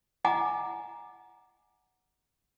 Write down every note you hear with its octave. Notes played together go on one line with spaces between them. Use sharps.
D#5 F#5 G#5 A#5 D6